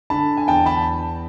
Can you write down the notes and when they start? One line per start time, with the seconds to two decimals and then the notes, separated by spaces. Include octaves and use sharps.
0.10 D3 A5 B5
0.37 G#5
0.48 E2 G5 A5
0.66 A5 B5